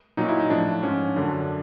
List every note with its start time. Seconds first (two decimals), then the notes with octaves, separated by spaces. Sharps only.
0.17 A#2 F#3 D#4
0.28 E4
0.39 D#4
0.50 A2 F3 D4
0.83 G#2 F3 C#4
1.16 F#2 D3 F#3 D4